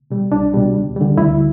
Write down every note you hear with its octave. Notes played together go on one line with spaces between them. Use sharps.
B2 G3
C2 D4
B2 G3
D2
D3 G3
D2 E4